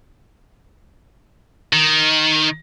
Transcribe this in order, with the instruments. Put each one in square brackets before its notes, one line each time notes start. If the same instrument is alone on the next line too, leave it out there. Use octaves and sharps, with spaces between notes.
[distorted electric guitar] D#3